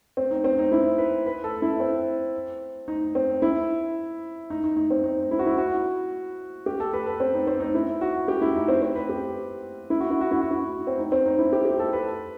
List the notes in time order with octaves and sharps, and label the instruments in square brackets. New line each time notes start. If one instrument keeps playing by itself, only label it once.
[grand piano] C4
D#4
C4
D#4
E4
B4
B4
A4
E4
C4
D#4
C4
E4
D#4
D#4
D#4
C4
D#4
E4
F#4
E4
F#4
G4
A4
B4
B4
C4
D#4
C4
D#4
E4
F#4
G4
E4
D#4
C4
C4
B4
G4
E4
F#4
E4
F#4
E4
F#4
E4
C4
D#4
C4
D#4
E4
G4
G4
A4
B4